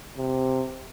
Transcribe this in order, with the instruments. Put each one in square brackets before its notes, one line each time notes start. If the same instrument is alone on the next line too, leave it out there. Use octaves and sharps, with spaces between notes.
[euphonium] C3